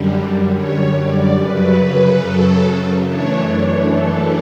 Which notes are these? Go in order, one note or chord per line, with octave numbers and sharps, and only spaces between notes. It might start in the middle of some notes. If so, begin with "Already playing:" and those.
Already playing: F#2 D3 G3
C#5
D5
F#2 C#3 F#3 B4
B4
A4
F#2 E3 A3 D4 C#5
C#5
A4